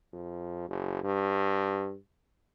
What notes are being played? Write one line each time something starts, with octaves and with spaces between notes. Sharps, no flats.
F2
F#1
G2